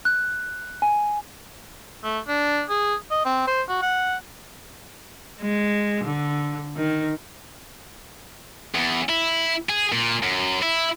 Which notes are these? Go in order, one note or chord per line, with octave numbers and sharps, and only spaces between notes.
F#6
G#5
A3
D4
G#4
D#5
C4
C5
F#4
F#5
G#3
D3
D#3
E2
E4
G#4
A#2
F#2
E4